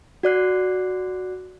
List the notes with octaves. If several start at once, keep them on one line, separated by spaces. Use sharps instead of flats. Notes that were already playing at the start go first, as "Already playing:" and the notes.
F#4 D5 F#6 C7